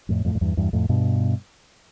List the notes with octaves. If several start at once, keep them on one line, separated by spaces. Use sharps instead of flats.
F2 A2
F2 A2
F2
E2 G2
E2 G2
F2 A2
G2 B2